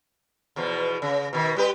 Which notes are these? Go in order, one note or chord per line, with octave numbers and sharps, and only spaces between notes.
E2 B2 F3
C#3
B2 D#3
G3 G4 B4